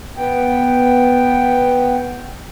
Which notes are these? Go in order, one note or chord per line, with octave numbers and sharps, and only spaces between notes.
B3 G5